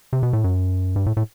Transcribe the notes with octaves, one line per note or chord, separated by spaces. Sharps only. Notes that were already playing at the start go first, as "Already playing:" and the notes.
C3
B2
A2
F#2
G2
A2
A2